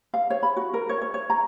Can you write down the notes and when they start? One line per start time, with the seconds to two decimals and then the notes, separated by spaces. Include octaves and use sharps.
0.14 F5
0.30 C#5
0.43 B5
0.56 F#4
0.74 A#4
0.89 C#5
1.01 C#5
1.14 C#5
1.30 A#5